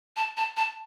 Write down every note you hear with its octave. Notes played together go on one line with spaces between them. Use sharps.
A5
A5
A5